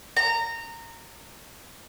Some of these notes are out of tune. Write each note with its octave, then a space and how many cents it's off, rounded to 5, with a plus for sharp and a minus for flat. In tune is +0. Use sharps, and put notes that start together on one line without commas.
A#5 -20